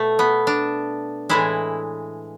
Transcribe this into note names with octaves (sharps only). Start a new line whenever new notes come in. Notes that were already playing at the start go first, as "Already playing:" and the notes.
Already playing: B2 A3
B3
D4
A2 E3 G#3 E4